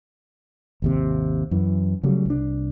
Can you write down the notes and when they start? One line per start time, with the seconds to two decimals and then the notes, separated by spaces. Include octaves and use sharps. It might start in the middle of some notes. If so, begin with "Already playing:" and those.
0.82 G#1 D#2 C3
1.51 F#2 E3
2.03 C#3 F#3 G3 A3
2.26 C2 D4